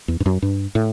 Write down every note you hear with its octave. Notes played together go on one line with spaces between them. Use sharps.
E2
G2
F#2
G2
A2